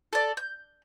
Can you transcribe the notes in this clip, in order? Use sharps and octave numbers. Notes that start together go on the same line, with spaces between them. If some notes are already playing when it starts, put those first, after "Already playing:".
A4 D5
G6